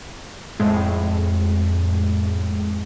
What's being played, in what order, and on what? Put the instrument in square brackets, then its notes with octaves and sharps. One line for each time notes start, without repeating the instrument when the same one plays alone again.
[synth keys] F2 A2 G#3